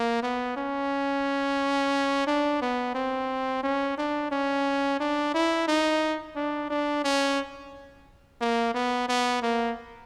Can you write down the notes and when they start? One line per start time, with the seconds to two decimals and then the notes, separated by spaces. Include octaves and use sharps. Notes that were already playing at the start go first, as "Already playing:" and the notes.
Already playing: A#3
0.23 B3
0.57 C#4
2.27 D4
2.62 B3
2.95 C4
3.63 C#4
3.98 D4
4.31 C#4
5.00 D4
5.34 E4
5.68 D#4
6.36 D4
6.70 D4
7.04 C#4
8.41 A#3
8.74 B3
9.09 B3
9.43 A#3